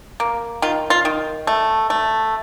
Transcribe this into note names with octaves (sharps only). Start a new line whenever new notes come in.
A#3
D#3 F4
F4
D#3
A3
A3